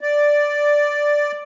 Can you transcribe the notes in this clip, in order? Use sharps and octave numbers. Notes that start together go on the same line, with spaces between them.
D5